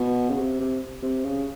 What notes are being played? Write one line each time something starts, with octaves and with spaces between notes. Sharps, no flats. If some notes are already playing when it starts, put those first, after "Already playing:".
Already playing: B2
C#3
C3
C3
C3
C#3